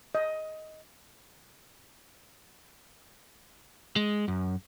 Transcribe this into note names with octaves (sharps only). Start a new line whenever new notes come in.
D#5
G#3
F#2